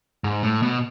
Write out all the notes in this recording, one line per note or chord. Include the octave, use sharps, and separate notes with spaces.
G#2
A2
B2